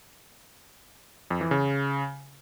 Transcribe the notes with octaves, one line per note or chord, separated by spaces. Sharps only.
F2
E3
C#3